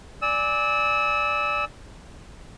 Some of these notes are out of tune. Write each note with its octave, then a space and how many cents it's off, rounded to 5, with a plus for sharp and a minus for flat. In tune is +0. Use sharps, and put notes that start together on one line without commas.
D5 +0 G#5 +0 E6 -25